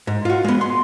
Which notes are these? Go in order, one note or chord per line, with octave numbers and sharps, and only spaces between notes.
G#2
F4 F#4
G#3 B3
C6